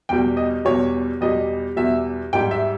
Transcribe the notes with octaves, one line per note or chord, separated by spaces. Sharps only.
E2 B2 G3 G5
D#5
E2 B2 G3 C#5
E2 B2 G3 D#5
E2 B2 G3 E5
G#2 G3 G5
E5